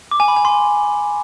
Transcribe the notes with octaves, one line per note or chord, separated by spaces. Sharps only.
D6
G#5
B5
G#5
C6